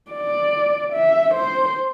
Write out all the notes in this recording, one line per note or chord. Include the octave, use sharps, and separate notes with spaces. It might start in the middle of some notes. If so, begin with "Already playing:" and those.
D5
E5
C5